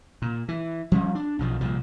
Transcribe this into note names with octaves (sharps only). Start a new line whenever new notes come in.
A#2
E3
F3 G3 C#4
D4
B1 C#3 F3
C2 A#2 F3